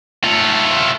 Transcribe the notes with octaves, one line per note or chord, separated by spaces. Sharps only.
A3 F4